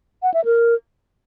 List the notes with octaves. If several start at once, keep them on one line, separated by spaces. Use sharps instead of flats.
F#5
E5
A#4